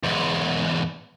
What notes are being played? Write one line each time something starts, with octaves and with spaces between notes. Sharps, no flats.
E2 G#2